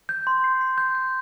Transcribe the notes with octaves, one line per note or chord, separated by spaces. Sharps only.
G6
C6
C7
C7
G6
G6